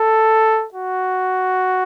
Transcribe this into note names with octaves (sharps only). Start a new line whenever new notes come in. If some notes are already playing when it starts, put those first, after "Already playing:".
Already playing: A4
F#4